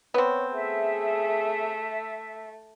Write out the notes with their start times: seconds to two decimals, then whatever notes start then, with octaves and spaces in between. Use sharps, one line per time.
0.14 B3 C4 C#5
0.54 A3 G#4 E5